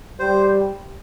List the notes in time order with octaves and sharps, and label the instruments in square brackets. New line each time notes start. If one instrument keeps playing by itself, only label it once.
[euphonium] G3 [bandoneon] C5